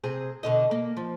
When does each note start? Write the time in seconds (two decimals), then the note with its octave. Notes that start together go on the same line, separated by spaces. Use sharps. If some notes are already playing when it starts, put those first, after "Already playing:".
0.04 C3 C4 G#4
0.43 B2 D3 D#5
0.71 A#3
0.97 F3